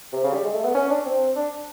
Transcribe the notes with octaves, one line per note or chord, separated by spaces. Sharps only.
C3
C#3
G3
G#3
A3
B3
C#4
D4
C4
D4